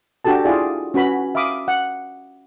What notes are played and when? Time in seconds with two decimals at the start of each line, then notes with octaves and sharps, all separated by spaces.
0.25 D4 F#4 G4 A4 A5
0.45 E4 F4 G#4 D5
0.94 C#4 F#4 B4 B5
1.35 E5 F5 B5 D6 D#6
1.68 F#5